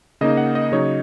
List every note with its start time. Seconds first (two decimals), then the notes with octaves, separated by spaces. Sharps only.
0.21 C#3 A#3 D#4 D#5
0.37 F#5
0.55 D#5
0.72 C#3 F#3 D#4 C#5